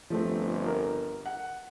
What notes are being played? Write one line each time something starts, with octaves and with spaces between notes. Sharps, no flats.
G1 F3 A3 C4
A#4
F#5